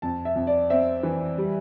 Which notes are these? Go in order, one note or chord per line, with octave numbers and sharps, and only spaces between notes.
F2 A5
E5
F2
D5
C4 E5
E3
G3